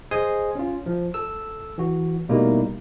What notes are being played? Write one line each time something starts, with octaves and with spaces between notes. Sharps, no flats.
G#4 C5 D#5 G#5 C6 D#6
C#4 F4
F3
A4 E6
E3 F#4
B2 G3 A3 A#3 D#4 E4